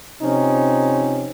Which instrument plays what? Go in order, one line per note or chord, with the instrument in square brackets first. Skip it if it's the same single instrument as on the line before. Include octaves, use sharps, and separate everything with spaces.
[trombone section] C3 F3 C4 C#4 D#4